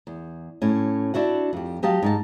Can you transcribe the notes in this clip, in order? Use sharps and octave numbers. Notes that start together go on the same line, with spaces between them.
E2
A2 C#4
D4 E4 F#4 F#5
F2 G4
F#3 G4 D#5 F5 A5
G#2 D#4 A5